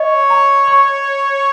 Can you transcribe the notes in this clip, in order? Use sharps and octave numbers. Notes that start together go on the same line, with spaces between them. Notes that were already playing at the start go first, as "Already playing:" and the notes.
Already playing: C#5 D#5
A#5
C#6